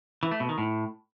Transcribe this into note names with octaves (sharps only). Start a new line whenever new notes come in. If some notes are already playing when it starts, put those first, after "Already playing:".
E3
A3
B2
D#3
A2